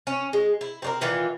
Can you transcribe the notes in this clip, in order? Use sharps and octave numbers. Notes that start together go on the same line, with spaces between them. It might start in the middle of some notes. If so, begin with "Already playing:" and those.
C#4
G#3
E4
C4 D4 A#4
A#2 D#3 E3 F4